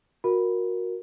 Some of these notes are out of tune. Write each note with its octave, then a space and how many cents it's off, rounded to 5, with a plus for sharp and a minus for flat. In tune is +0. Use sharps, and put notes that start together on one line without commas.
F#4 -20 A#4 +0